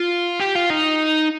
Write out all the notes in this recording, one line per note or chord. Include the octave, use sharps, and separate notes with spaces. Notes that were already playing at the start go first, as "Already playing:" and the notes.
Already playing: F4
G4
F4
D#4